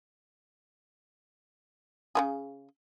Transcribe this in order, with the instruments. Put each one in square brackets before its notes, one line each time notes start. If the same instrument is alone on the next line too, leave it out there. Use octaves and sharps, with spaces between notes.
[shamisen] C#3 E3 G#4